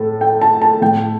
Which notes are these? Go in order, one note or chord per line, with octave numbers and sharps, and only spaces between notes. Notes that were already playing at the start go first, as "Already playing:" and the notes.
Already playing: A2 A4
G5
A5
A5
A2 G5